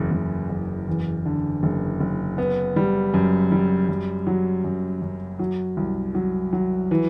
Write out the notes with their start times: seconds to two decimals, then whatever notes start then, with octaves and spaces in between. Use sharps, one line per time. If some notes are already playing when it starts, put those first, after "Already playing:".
Already playing: F#1 E2
0.11 F#1
0.49 F#1
0.88 E2
1.26 D3
1.63 F#1
2.00 F#1
2.38 B3
2.76 G3
3.14 F#2
3.52 G3
3.89 F#2
4.27 F#3
4.64 F#2
5.02 F#2
5.39 F#3
5.77 C2
6.15 F#3
6.53 F#3
6.91 E3